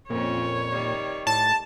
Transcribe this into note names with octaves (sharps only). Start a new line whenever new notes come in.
F2 A#2 C4 C#4 C#5
D#3 G3
A2 A5